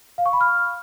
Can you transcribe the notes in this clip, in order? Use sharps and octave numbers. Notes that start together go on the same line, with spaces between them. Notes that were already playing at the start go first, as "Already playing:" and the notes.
F5
C#6
B5
F6